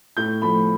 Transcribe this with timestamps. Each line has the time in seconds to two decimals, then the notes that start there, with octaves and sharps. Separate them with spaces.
0.17 A2 G6
0.42 F3 A3 B5